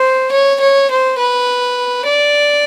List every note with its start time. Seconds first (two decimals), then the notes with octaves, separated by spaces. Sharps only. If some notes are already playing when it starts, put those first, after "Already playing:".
Already playing: C5
0.32 C#5
0.60 C#5
0.91 C5
1.19 B4
2.06 D5